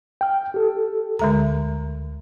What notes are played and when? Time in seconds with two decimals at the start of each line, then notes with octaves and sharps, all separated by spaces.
0.21 G5 F6
0.54 G4 A4
1.19 D2 D3 G#3 A#5